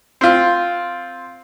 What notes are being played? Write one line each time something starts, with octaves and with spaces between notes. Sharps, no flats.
C4 F4